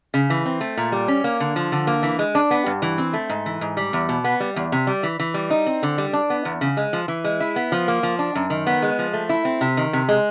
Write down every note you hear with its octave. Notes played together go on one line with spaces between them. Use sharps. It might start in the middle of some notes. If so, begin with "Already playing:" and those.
C#3
E3
C4
A3
A#2
G3
C#4
A#3
D3
F3
D3
A#3
E3
G#3
D4
B3
G2
E3
C4
A3
G#2
E3
G#2
G3
E2
B2
B3
G3
E2
C3
G3
E3
E3
G3
D#4
C4
D3
G3
D4
B3
E2
C#3
G#3
F3
E3
G#3
E4
B3
F3
A#3
F3
D4
F#2
D#3
B3
G#3
F3
A3
E4
C4
C3
D#3
C3
G#3